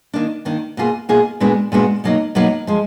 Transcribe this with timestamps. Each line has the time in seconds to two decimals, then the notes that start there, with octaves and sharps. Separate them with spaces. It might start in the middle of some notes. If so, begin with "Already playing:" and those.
0.14 D#3 A#3 D4
0.45 D#3 A#3 D4
0.77 B2 A#3 F4 G#4
1.09 B2 A#3 F4 G#4
1.40 A#2 G#3 B3 D4 F#4
1.72 A#2 G#3 B3 D4 F#4
2.04 B2 F#3 A#3 D#4
2.35 B2 F#3 A#3 D#4
2.67 F3 G#3